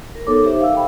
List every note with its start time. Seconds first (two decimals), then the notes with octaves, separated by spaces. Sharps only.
0.15 A#4
0.27 B3 D#4 A4 C#5 D6
0.42 D#4 G4 C5 E5
0.61 F5 E6
0.74 F5 G5 B5